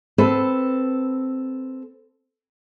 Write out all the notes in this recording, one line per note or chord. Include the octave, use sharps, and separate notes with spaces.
C4 A4 B4 C5